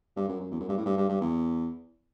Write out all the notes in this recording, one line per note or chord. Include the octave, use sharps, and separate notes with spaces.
G2
F#2
F#2
E2
F#2
G2
A2
G2
G2
G2
E2